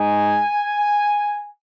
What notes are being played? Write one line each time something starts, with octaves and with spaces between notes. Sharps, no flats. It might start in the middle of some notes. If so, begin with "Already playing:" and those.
Already playing: G#2 G#3 D#4 G#5